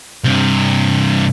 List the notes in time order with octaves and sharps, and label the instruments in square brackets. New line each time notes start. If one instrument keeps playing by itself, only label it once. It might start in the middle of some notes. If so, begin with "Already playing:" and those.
[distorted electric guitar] G2 C3